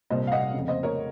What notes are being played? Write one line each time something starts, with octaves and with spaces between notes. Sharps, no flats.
C2 A#2 C5 D#5
F5
D#5 F#5
F2 C#3
C5 D#5
A#4 C#5